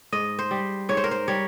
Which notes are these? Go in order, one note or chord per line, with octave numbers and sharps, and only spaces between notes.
G#2 D#5
C5
G3
G#2 C#5
C5
A#4
C5
G3 C#5